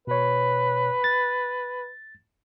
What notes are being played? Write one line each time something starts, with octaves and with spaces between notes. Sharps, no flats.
B2 B4 C#5
A6